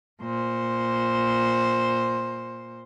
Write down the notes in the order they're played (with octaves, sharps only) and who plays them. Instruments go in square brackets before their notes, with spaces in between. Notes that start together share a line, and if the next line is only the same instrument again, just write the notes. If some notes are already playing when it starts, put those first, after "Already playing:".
[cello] A#2 C5